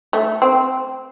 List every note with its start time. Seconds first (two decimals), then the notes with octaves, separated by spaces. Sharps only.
0.13 A3
0.42 C4